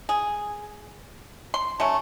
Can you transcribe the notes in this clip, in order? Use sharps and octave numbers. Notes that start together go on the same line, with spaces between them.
G#4
C6
F#3 A3 C#4